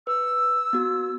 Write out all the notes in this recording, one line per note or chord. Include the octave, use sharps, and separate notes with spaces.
B4 E6
B3 F#4